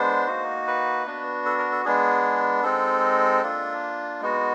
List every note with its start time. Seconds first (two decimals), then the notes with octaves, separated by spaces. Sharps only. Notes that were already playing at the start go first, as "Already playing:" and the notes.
Already playing: G#3 B3 D4 C5
0.27 A#3 D#4 F#4
0.67 B4
1.06 B3 D4 F#4
1.46 A4
1.58 A#4
1.72 A4
1.85 G#3 B3 D4 G#4
2.63 G#3 C4 D#4 A4
3.43 A#3 D4 F4
4.21 G#3 B3 D#4 F#4